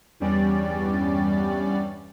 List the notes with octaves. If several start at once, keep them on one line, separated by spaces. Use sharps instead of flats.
E2 G2 G3 C#4 D5